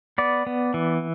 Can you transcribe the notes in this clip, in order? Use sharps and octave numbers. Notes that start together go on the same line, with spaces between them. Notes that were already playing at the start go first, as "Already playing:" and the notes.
B3 D5
B3
E3